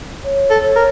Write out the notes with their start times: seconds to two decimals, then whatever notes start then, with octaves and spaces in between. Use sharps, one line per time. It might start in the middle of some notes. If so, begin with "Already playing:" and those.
0.24 C#5
0.50 A4
0.63 C#5
0.76 A#4